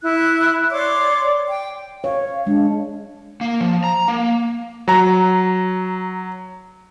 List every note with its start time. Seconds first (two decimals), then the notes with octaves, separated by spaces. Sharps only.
0.03 E4 F#6
0.71 C#5 D5 C6 D6
1.48 G5
2.04 C#5 F5
2.47 G#3 D4
3.41 A#3
3.61 F3
3.84 A#5
4.08 A#3
4.88 F#3 A#5